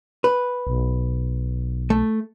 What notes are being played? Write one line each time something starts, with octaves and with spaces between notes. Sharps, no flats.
B4
B1
A3